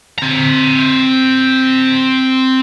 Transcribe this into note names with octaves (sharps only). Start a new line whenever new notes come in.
C4 A#5